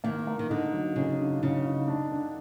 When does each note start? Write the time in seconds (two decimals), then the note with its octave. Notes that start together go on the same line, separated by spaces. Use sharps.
0.04 D#3 A#3
0.27 A#3
0.39 D#3
0.50 D3 D#4
0.73 F#3
0.96 C#3 D#4
1.19 D3
1.42 C#3 D#4
1.66 D#4
1.88 D4
2.11 D3